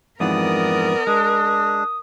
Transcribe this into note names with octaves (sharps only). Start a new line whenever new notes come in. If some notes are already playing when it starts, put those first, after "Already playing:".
F2 G#2 E3 B3 A#4 D5 D#6
G#3 D4 D#6